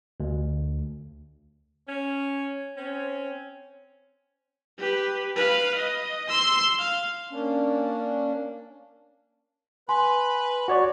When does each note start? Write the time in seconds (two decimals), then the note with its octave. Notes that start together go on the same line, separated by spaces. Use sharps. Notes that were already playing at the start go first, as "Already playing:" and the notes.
0.20 D2
1.88 C#4
2.76 C4 C#4
4.78 G4 B4
5.36 B4 F5
5.74 D#5
6.29 C6 E6
6.79 F5
7.30 A#3 C#4 D4
9.89 B4 G#5 B5 C6
10.68 F#4 C#5 D5